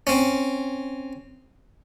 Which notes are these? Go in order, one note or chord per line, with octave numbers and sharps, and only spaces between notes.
C4 C#4